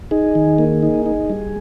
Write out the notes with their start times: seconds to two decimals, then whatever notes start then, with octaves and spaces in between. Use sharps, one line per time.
0.11 D#4 G#4
0.35 D#3
0.59 A#3
0.83 D#4
1.06 D#4
1.30 G3